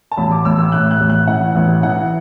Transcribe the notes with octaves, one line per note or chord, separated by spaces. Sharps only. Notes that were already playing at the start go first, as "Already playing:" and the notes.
A5
A1 B5
D6
A1 E6
E6
A2 F#6
F#6
A1
F#6
E3 F#5
A1
E3 F#5